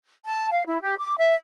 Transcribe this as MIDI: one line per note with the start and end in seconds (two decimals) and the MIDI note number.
0.24 0.49 81
0.52 0.63 77
0.67 0.80 64
0.81 0.96 67
0.98 1.16 86
1.18 1.34 76